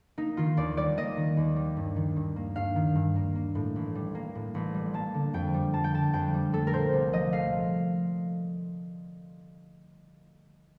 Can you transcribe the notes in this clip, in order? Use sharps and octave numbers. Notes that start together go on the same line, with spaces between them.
A#3 D#4
D#3 F4
D#2 D5
G3 D5
A#3 D#5
D#3
D#2
G3
G2
D#3
G2
A#3
G2 F5
D#3
G2
A#3
A#3
A2
A1
G3
A#3
A2
A1
G3
A#3 A5
D3
F2 G5
G3
A#3 A5
G5
D3 A5
F2 G5
G3
A3 A4
A#4
A#2 C5
C2
F3 D#5
A3 F5